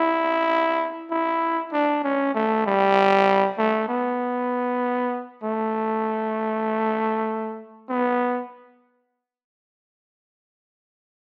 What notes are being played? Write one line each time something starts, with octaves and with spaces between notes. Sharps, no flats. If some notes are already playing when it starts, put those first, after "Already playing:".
Already playing: E4
E4
D4
C#4
A3
G3
A3
B3
A3
B3